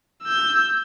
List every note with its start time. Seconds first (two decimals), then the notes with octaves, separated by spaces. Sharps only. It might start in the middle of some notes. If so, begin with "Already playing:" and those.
0.24 E6 G6